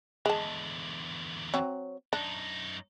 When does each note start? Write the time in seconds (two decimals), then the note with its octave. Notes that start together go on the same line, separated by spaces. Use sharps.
0.26 E2 D3 G#3 A5
1.54 F#3 C4 C#5
2.13 F#2 D4 D#4